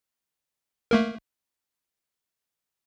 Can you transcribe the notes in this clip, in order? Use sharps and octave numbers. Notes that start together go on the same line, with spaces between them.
A3 A#3 A#4